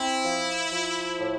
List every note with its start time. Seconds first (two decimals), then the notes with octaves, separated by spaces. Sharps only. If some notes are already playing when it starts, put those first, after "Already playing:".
Already playing: C4 E4
0.25 F3
0.72 F3
1.19 A2